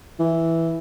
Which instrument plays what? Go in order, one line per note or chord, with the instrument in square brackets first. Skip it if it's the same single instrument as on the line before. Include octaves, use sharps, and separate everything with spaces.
[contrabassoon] E3